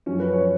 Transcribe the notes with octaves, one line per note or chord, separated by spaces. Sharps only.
F#2 F3 C#4
B4
C#5